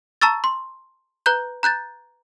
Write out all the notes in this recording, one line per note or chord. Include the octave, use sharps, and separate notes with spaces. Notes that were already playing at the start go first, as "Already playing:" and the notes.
A5 A#5 C#6 E6 A6
C6
B4 A#5 F#6 G6
A#5 F#6 G6 A6